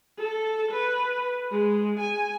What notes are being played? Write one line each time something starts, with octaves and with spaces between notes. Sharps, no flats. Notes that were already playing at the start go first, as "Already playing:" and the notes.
A4
B4
G#3
G#5